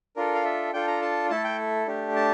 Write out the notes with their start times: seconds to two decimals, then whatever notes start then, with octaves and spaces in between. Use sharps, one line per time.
0.16 D4 F4 A4 A#4
0.35 F5
0.45 E5
0.73 D4 F4 A4 G5
0.88 A#5
1.02 A5
1.30 A3 E4 A4 A5
1.44 G5
1.87 A3 D4 G4
2.16 A5